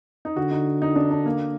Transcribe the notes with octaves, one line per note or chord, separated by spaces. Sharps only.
D#4
D3 F#4
D#4
D#4
D4
D4
A#3